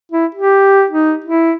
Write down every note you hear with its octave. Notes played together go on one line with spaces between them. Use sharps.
E4
G4
D#4
E4